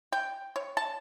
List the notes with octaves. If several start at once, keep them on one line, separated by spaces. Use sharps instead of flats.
G5
C#5
A5